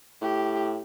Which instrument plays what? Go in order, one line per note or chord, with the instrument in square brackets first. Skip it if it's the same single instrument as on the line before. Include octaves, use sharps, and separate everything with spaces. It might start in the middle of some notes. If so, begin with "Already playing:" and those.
[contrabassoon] A2 [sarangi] G4